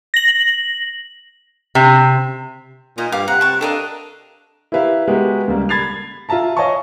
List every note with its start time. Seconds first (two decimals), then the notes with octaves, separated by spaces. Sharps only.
0.14 A#6 F#7
1.75 C3
2.98 A#2 D#4 D#5
3.12 G2 F5 D6
3.28 C3 F#5 G5 A#5 F#6
3.41 A5 C#6
3.61 D4 A4 A#4 D#5 F5
4.72 E4 G4 A#4 B4 E5 F5
5.08 G#3 B3 F#4 G4 A#4
5.48 C#2 G3 A#3
5.69 B5 G#6 A6 C7 F7
6.29 F4 E5 F5 A5 A#5
6.57 C#5 D#5 F5 G#5 A5 C#6